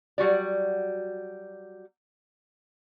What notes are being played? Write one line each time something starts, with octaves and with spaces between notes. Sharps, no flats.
F#3 G3 F#4 D5